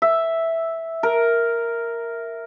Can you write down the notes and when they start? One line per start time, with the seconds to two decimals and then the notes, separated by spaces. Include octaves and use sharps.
0.02 E5
1.03 A#4